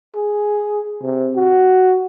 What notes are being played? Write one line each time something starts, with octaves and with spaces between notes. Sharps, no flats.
G#4
C3
F#4